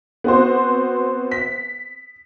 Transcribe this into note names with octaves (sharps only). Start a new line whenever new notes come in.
B3 C4 F#4 C5
B6